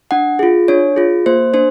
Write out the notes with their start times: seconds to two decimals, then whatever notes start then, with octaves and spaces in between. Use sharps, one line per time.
0.11 D4 F#5
0.39 F4 G#4
0.68 D4 C#5
0.96 F4 G#4
1.26 A#3 C5
1.54 D4 C5